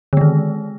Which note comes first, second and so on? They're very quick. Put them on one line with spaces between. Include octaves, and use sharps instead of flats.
D3 G#3 D#3